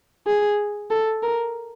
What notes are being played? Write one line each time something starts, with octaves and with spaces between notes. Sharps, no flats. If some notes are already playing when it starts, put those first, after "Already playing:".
G#4
A4
A#4